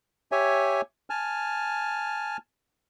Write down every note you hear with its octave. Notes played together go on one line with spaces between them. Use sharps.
G4 C#5 E5 G#5
G#5 A5 F6